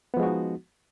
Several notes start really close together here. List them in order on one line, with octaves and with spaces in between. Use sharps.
B3 F3 G#3 F#4 D#4